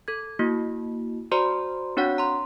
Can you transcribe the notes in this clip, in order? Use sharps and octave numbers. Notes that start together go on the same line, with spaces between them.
A4 G#6
A#3 E4 F#4
F#4 C5 D5 A#5 C6
C4 D4 F#4 C#5 F#5
A#5 C6